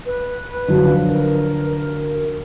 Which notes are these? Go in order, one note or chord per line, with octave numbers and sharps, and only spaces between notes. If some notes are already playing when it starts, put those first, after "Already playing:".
B4
D3 F3 F#3
A#4